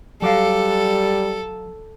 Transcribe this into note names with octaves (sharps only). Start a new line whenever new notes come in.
F#3 G3 A4 D5 F5